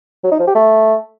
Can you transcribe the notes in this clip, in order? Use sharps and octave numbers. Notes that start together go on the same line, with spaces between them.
F#3
D#4
F3
G4
A3